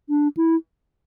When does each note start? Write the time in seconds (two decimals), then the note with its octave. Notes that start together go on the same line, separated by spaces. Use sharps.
0.09 D4
0.37 E4